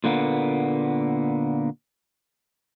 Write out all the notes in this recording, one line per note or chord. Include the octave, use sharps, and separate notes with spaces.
A#2 D3 A#3 B3